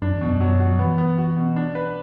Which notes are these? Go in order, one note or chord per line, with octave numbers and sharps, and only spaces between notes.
F#2 D4
E2
B2
F#2
F#3
F#4
F#3
E3 B3
B3
F#4
B2
D4
B4